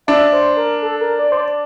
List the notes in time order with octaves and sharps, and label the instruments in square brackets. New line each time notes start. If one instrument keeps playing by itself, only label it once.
[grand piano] D4 [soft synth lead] E5
[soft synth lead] C5
A#4
A4
A#4
D5
C5
D5